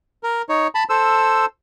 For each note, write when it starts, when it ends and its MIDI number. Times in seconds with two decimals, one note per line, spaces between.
0.23 0.42 70
0.49 0.67 63
0.49 0.67 73
0.75 0.84 81
0.75 0.84 83
0.90 1.45 69
0.90 1.45 72
0.90 1.45 88